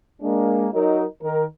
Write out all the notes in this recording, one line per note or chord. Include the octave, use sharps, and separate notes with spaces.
G#3 A#3 D4
F#3 D#4 A#4
D#3 A#4